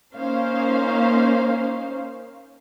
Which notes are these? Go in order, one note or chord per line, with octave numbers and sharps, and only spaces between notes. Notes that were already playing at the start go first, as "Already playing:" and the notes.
A#3 C#4 D#4 C5 F5